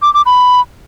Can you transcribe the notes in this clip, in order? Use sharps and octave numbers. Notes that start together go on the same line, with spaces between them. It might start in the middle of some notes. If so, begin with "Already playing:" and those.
D6
D6
B5